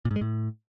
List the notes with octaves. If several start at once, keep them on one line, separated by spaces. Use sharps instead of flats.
A#2
G#2
G#3
A2